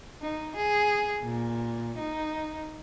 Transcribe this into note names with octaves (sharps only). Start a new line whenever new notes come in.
D#4
G#4
A#2
D#4